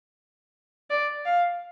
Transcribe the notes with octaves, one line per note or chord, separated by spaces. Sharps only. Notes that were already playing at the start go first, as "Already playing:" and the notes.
D5
F5